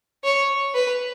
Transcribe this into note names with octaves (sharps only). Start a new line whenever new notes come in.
C#5
B4